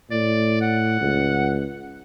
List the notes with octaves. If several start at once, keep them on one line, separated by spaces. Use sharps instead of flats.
A2 D5
F#5
C#2